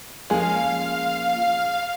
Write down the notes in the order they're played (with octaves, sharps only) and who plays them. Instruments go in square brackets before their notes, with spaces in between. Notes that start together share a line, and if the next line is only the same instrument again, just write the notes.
[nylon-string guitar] F3 A#3 C#4 [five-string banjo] G#3 G#4 [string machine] F5